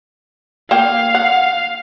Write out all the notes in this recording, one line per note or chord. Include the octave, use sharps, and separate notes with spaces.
A#3 F5 G5
F#5